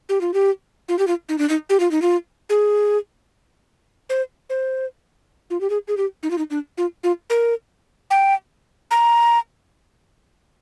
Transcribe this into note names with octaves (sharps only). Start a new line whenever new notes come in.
G4
F4
G4
F4
G4
F4
D#4
D4
D#4
G4
F4
D#4
F4
G#4
C5
C5
F4
G4
G#4
G#4
G4
D#4
F4
D#4
D4
F4
F4
A#4
G5
A#5